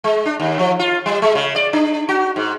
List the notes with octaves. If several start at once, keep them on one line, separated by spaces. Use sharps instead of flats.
G#3
D4
D#2
F3
F4
G3
G#3
C#3
D5
D4
F#4
G#2